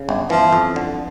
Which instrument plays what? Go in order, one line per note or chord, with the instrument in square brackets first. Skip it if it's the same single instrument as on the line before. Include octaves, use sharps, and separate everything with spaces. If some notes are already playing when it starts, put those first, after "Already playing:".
Already playing: [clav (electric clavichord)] C#3
G1
[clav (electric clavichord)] E3 [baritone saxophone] F3
[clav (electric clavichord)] F2
D3